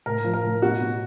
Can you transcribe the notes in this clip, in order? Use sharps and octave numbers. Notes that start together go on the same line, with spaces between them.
A2 A#4
F3
A#4
A2
B2 F#4
B2